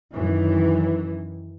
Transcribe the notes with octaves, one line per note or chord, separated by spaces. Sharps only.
F#2 D#3 E3